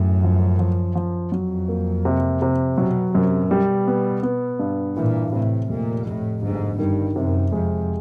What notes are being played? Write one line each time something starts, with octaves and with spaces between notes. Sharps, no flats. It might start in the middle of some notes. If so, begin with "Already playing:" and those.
Already playing: F#2 A2
F3
F3
F3
F2 F#3
A#3
C3
C3
B2 F#3
F#2 C3
B2 G3
B3
B3
G2
A#2 E3
A2 C3
F1 A#2
F1 A2
G1 G#2
G2 D#3
F#2 C3
F2 G#3